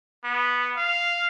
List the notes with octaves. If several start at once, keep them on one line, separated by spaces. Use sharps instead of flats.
B3
F5